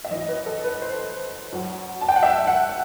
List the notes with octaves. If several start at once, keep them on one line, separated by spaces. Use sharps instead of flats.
E5
F#2 E3 D#5
B4
A4
B4
C5
F#2 F#3
A5
G5
F#5
E5
F#5